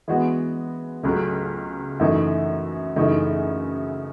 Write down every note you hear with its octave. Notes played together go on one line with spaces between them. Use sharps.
E3 G#3 B3 F#4
C#2 C#3 F#3 A3
F#2 E3 A3 D#4
F#2 C#3 E3 A3 D#4